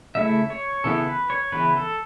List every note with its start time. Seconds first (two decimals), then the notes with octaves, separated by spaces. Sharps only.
0.15 C#3 A3 E4 E5
0.50 C#5
0.84 C#3 E3 B3 E4 A4
1.07 B4
1.30 C#5
1.52 C#3 E3 B3 E4 B4
1.76 A4